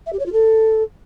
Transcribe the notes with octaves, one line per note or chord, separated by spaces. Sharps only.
E5
G4
C#5
F4
A4